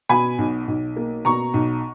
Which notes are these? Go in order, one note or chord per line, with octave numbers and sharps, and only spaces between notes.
B2 G#5 B5
B1
B1
A#3
B2 A#5 C#6
B1